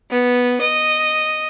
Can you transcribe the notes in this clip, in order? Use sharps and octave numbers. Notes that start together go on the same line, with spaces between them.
B3
D#5